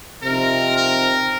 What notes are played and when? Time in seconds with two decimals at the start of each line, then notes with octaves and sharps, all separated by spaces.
0.22 C3 F3 C4 D#4 A#4
0.77 A#4